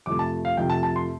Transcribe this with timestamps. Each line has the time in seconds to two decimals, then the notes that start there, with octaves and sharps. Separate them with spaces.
0.06 F2 C3 F3 A3 D6
0.19 A5
0.45 F5
0.57 F2 C3 F3 A3 G5
0.70 A5
0.83 A5
0.96 C6